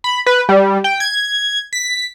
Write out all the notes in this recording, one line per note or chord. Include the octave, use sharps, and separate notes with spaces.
B5
B4
G3
G5
G#6
B6